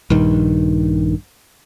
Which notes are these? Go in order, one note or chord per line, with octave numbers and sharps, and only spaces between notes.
A#1 G2 D#3